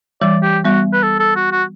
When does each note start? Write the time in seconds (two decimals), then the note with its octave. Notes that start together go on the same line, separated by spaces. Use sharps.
0.21 E3 G3 D5
0.43 G4
0.65 G3 B3 F#4
0.93 B4
1.03 A4
1.19 A4
1.36 F#4
1.52 F#4